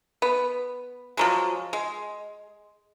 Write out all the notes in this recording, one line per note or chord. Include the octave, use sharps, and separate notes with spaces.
B3
F3 F#3 G#3
G#3